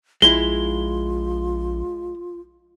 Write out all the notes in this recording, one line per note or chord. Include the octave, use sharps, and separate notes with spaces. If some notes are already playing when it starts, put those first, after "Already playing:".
A#1 G#3 E4 F4 G7